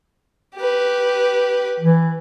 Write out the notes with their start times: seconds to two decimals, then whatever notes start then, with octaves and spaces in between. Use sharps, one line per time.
0.56 G4 B4
1.80 E3